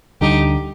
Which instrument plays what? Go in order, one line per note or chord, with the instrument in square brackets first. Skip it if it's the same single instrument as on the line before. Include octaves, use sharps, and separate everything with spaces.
[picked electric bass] D2 D3 G3 D4 [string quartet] D#4 G4